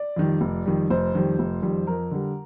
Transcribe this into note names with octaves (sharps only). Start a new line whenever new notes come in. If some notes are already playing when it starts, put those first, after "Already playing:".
Already playing: D5
F2 D#3 G3
F1
F2 D#3 G3
F1 C5
F2 D#3 G3
F1
F2 D#3 G3
F2 A#4
D3 G3